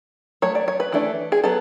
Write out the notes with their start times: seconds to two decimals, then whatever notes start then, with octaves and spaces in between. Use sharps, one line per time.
0.42 F#3 A3 C#5
0.55 D5
0.68 C#5
0.80 B4
0.93 E3 A3 D4
1.32 G#4
1.44 F#3 B3 A4